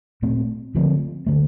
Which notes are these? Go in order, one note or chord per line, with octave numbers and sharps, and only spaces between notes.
A#2 A3 C4
D3 F3 A3 C4
D3 A3